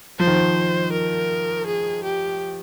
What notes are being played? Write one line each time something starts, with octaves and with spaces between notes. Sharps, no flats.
F3 C5
D#3
F3
A#4
G#4
G4